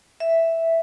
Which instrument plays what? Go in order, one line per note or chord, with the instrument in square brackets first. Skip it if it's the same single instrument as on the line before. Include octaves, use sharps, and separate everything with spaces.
[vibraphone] E5